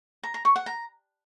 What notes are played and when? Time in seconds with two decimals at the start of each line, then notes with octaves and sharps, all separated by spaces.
0.23 A#5
0.34 A#5
0.45 C#6
0.56 F#5
0.66 A#5